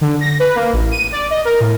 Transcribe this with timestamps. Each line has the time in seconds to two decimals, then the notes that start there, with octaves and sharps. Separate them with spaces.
0.01 D3
0.21 A#6
0.40 B4
0.56 A#3
0.73 A1
0.91 D#7
1.12 D5
1.30 D#5
1.45 A#4
1.60 A2